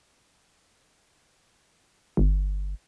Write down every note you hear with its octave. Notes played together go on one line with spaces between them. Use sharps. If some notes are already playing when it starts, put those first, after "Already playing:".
G1